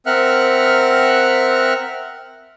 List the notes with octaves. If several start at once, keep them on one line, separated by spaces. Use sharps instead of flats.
C4 A#4 E5 F#5 F6 F#6